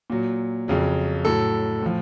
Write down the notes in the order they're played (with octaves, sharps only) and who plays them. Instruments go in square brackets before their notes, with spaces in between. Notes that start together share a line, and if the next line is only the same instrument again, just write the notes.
[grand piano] A#2 F#3
F2 C#3 F#3
A2 F#3 A4
A2 F3